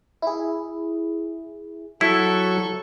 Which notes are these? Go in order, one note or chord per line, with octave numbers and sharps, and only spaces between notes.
E4 G#4
F#3 E4 A4 C#6